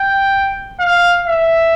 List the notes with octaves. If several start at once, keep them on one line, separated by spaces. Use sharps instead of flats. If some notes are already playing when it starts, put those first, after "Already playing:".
Already playing: G5
F5
E5